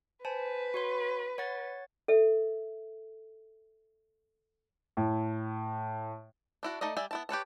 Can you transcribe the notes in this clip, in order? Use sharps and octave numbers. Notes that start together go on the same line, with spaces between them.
B4 C5 G#5 A5
F#4 C#5 C6
C#5 F#5 A6
A4 E5
A2
D4 E4 F#4
A3 D#4 D5 D#5
G3 D5 E5 G#5
B3 E4 A5
G4 B4 C#5 A5